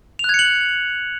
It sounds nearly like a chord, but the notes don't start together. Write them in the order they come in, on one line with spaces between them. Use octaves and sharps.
F7 F#6 G#6 C#7 F#7